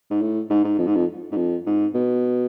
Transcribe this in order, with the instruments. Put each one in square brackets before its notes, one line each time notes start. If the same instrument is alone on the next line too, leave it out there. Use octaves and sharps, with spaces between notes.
[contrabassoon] G#2
A2
G#2
G#2
F2
G#2
F2
G#2
F2
G#2
B2